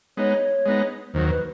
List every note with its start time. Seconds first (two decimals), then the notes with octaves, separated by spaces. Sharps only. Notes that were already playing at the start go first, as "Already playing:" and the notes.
0.17 G#3 B3 D#4 C#5
0.66 G#3 B3 D#4
1.14 D#2 D#3 F#3 C5
1.30 B4